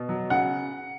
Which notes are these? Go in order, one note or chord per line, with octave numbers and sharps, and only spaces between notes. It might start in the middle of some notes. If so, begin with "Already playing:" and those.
Already playing: B2
F#3
C#3 F#5